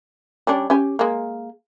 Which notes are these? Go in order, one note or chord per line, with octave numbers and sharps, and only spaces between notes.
G3 C#4 D4
C#4 G4 G#5
G#3 A#3